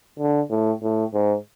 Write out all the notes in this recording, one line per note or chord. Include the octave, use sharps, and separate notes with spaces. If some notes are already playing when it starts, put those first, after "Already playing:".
D3
A2
A2
G#2